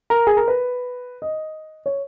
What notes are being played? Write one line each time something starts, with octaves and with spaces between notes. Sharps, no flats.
A#4
G#4
A#4
B4
D#5
C#5